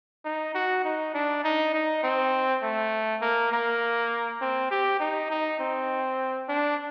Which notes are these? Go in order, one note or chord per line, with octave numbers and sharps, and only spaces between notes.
D#4
F#4
D#4
D4
D#4
D#4
C4
A3
A#3
A#3
C4
G4
D#4
D#4
C4
D4